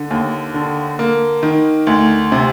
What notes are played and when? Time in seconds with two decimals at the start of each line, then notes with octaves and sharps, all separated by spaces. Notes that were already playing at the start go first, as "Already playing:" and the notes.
Already playing: D3
0.11 D#2
0.54 D3
0.99 A#3
1.43 D#3
1.87 D2
2.32 C3